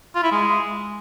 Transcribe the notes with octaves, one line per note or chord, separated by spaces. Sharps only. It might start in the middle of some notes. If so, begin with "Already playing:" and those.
F4
E4
G#3